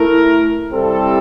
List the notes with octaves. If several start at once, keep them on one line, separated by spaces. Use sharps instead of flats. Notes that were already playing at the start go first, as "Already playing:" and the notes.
Already playing: A3 E4 A#4
C3 G3 C4 E4 A4